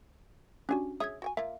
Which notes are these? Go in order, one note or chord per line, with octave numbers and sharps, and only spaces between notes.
C#4 D4 F#4 G4 G#5
G#4 C#5 E5 D#6 G#6
F#4 G5 G#5
A#3 F4 E5